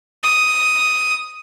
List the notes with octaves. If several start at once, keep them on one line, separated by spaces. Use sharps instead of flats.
D#6